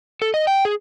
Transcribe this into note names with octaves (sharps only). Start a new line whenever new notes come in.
A4
D#5
G5
G#4